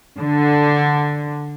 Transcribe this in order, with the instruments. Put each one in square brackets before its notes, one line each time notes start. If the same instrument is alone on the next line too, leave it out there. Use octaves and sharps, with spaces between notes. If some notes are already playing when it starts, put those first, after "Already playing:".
[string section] D3